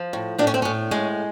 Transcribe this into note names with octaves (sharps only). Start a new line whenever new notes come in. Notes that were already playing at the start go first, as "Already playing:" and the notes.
Already playing: F3
A2
A2 D4
C#4
C4
A2 C#4
G#3 C#4